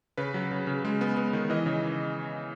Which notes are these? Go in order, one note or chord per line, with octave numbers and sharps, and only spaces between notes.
C#3 B4
F#3
C#3
C#3
G#3
B3
B3
D#3
E3 D#5
C#3